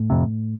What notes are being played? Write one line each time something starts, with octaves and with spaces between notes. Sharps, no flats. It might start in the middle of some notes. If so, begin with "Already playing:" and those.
Already playing: A2 A3
F2 C3